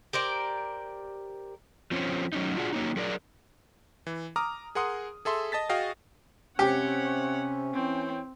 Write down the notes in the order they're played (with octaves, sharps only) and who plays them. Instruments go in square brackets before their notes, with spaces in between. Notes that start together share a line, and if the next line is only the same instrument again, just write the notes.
[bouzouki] G4 A#4 C5 D5
[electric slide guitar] F3 C4 C#4
F#3 C#4 D#4
D4 F4 F#4 G#4
F#3 A#3 C#4 D#4
F#3 G#4 A#4 D5
[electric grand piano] E3
A#5 D6 D#6 F6
G#4 A#4 F#5 C6 D#6
G#4 A4 E5 C6
D#5 A5 A6 B6
F#4 G#4 D#5 F5 G5
[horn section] C3 [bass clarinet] C#4 [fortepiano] G4 [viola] C#5 F#5
[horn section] E3 C#5 G5 [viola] C4